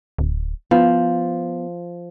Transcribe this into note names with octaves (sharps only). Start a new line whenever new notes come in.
D1
F3 B3